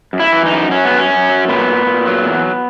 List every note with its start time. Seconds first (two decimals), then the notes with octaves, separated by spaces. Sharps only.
0.13 F#2
0.20 E4
0.33 E3
0.46 D#4
0.52 F#2
0.71 F#3 C#4
0.85 B3
0.91 F#2
0.99 C#4
1.10 F#2
1.29 F#3
1.48 A#2 B3
1.68 A#2
1.87 A#2
2.06 F#3
2.25 E2